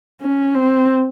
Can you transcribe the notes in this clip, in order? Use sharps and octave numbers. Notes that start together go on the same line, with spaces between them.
C#4
C4